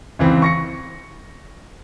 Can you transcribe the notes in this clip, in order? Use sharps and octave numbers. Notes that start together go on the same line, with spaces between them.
C#2 E3 C4
C#6 A#6 C#7